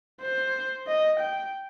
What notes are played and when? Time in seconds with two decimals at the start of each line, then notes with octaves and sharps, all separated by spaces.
0.21 C5
0.87 D#5
1.19 G5